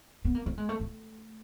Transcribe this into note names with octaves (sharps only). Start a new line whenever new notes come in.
B3
A#3
A3
G#3
A3
A3